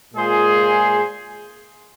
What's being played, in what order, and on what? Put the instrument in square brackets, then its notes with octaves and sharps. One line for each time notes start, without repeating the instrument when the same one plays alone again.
[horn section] A#2 G#3 F4 G#4 C5